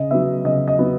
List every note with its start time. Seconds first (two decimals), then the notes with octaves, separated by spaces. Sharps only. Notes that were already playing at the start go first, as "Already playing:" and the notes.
Already playing: C#3 D#5
0.11 F#3 B3 E5
0.44 C#3 D#5
0.68 D#5
0.78 F#3 B3